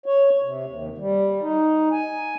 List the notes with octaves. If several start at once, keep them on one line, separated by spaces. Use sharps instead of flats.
C#5
C3
D#2
G3
D#4
G#5